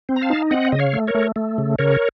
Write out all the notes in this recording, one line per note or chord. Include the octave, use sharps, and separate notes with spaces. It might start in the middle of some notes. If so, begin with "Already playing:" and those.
C4
A#5
F5 A5
D#4
C4 D#5 F#5
C#3 D#5
C#5 F5
A3
A#4 C#5
A3
A3
C#3
C#3 A#4 C#5